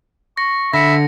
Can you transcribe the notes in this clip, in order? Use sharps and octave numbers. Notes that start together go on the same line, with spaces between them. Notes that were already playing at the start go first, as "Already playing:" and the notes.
C#6 A#6
D3 E5 B5 A#6 C#7